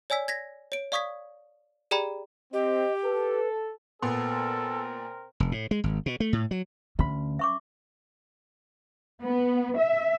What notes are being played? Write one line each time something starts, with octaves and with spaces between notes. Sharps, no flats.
C#5 D5 G#5 E6 B6
G#6 A#6 B6
C#5 D7
D5 F5 C#6 D#6 G#6 B6
G4 G#4 D5 G5 A#5 B5
C4 G4 D#5
A4 B4
A#2 B3 C4 A4 A#4 C6
F1
A2
G#3
G#1
B2
A3
A2
F#3
D2 C#4 B5
E5 C#6 D6
B3
E5